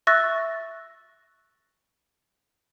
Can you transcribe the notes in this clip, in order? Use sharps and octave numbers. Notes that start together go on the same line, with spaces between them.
E5 C#6 E6 F#6 A6 A#6